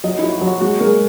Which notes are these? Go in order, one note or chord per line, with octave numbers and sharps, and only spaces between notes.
F#3 D#5
F#3 E4
F#4
F#3
F#4
G#3 F#4
G#3 A#4